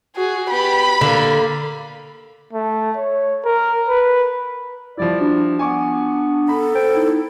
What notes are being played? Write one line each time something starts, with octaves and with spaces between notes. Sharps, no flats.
F#4 G#4
B3 G4 B5
D3 A#3
A3
C#5
A#4
B4
F3 G3 E4 D5
D4 F#4
B3 G#5 C#6 D6
A4 A#5 B5
C5 G5
D#4 E4